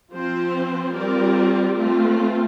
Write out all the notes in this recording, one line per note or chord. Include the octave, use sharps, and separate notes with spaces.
F3 C4 F4 C5
G3 C4 F4 A#4 D5
A3 C4 F4